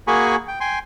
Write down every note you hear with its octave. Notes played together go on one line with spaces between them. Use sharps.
A#3 F#4 G#4 G#5 B5 C#6
G5
G5 G#5 C6